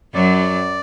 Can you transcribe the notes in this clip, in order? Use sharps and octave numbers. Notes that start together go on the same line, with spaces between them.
F#2 F#3 D5